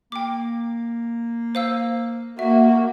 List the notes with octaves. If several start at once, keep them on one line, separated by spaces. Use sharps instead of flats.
A#3 G5 D6
C5 F5 E6
A#3 F#4 E5